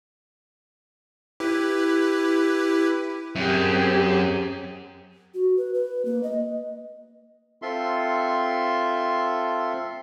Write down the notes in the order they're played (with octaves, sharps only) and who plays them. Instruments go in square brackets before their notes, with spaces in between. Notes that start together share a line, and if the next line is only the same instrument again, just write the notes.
[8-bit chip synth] E4 G4 B4
[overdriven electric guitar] F#2 [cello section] C4 G4 G#4
[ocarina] F#4
B4
B4
A#3
D#5
[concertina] C4 F4 A4 E5 C6